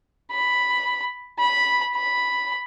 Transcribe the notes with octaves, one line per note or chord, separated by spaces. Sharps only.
B5
B5
B5